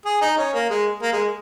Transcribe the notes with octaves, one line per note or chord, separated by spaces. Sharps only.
G#4
D#4
C#4
A#3
G#3
A#3
G#3